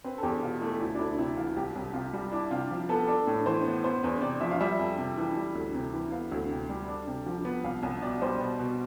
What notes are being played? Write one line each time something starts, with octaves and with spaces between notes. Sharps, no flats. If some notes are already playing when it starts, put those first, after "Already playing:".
C4 B4
A4
E2 G4
B2 F4
A3 E4
D2 E4
D4
D2 E4
C3 E4
E3 F4
C2 G4
C2
C3 F4
G3
D4 E4
C3 F4
F3
B3 A4
D4 A4
A2
E3 C5
B3
B3 C5
E2 B4
C3 D5
F3 E5
F5
G3 E5
F2
C3
E3
G3
D2
C3
E3
B3 F5
D2
C3
G3
D4
C3
F3
B3
C2 F5
C2
B2 D5
G3 C5
B2
B2